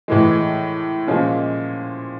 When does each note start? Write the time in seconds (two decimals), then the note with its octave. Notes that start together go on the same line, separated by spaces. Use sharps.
0.08 A2 E3 G#3
1.08 A#2 F3 G#3 C#4